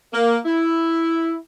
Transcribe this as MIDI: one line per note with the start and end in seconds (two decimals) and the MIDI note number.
0.13 0.38 58
0.45 1.36 64